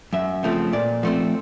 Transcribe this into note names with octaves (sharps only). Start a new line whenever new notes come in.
F#2 E5
C#3 F3 A3 C4
A#2 D5
F3 A3 C4